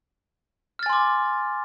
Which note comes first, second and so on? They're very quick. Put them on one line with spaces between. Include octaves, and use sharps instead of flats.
F6 A6 G#5 C6 D6